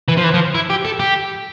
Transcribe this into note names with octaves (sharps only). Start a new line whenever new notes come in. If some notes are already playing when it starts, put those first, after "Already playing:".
E3
F3
E3
F3
E4
G4
A4
G4